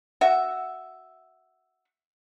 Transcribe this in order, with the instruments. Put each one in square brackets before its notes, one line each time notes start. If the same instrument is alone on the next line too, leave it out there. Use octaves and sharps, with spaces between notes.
[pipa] F#4 E5